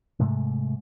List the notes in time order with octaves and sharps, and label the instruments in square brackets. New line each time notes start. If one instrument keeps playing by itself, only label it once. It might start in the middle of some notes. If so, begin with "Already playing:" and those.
[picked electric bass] G#2 C3 G#3 A3